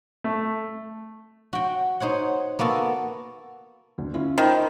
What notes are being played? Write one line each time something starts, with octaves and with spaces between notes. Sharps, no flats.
A3
F#4 G5
D#4 C5 C#5 F#5
A#3 B3 F#4 A4
D2
C#4 E4 F4
D#3 C5 A#5 B5